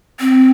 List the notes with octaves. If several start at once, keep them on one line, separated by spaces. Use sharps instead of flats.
C4